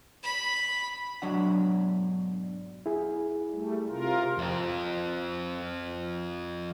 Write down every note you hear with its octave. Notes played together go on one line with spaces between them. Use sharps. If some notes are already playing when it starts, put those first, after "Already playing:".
B5
B1 G#2 F#3 D4 F#5
E4 G#4
G3 A3
C3 F4 A#4
F2 C4